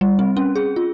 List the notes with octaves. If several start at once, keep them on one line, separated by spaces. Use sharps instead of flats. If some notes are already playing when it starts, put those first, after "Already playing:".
G3
C4
C#4
G#4
F4